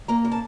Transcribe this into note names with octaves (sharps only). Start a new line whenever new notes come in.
A#3 A#5
C#3
A5